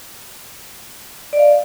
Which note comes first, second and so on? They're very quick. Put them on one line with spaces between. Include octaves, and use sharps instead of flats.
D5 D#5 F5